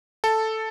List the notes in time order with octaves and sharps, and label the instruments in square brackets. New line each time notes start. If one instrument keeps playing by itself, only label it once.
[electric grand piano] A4